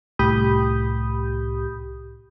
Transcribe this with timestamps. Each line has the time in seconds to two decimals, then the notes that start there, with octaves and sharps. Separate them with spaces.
0.19 C2 A2 G4 B5 D#6 G6